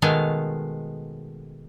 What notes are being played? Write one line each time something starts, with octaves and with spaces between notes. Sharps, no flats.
B2 D#3 G#3 A3 B3 F5